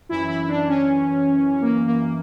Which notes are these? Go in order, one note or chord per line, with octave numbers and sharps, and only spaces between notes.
F#2 E3 E4
E4
D4
C#4
A#3
A#3